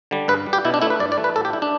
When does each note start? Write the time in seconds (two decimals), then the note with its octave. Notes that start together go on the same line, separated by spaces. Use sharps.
0.11 D3 G3
0.28 G2 B4
0.46 G3
0.53 G4
0.65 B2 E4
0.74 D4
0.81 A3 E4
0.90 B4
1.00 G2 D5
1.12 D5
1.17 E3 A3
1.24 B4
1.36 A2 A4
1.45 G4
1.53 G3 E4
1.62 D4